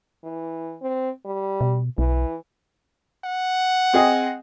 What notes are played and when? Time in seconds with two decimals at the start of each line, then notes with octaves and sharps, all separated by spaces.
0.24 E3
0.82 C4
1.25 G3
1.61 B2
1.98 B1 E3
3.24 F#5
3.93 C4 G#4 D#5